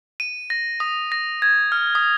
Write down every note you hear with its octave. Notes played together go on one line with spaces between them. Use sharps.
D#7
A#6
D#6
A#6
G#6
F6
D#6